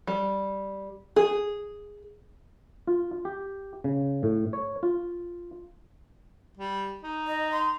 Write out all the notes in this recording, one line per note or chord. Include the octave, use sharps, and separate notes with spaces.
G3
G#4
F4
G4
C#3
A2
C#5
F4
G3
D#4
D#5
C6